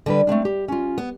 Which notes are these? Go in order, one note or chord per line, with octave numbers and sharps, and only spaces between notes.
D3 G3 B4
A3 A#3 C4 D4
G4
C#4 F4
B3